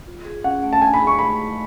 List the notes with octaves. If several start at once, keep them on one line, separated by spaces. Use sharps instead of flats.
F4
G#4
C#4 F#5
A3
A5
D4 G#5
B5
G#4
C#6
A3 B5